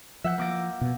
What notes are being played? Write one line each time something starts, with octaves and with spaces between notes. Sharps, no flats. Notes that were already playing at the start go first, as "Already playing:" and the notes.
F3 E5 F#5 G6
A#3 D6 A#6
B2